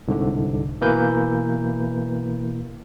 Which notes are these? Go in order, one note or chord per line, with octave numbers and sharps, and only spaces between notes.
C2 G#2 D3
B2 E3 A#3 A#4 B4 G6